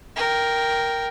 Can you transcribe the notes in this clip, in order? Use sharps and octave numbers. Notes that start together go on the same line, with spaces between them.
A#4 G5